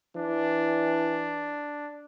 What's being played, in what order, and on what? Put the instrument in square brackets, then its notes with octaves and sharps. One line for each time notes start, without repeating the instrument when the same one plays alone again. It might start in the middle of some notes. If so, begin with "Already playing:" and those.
[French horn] E3 [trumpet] D4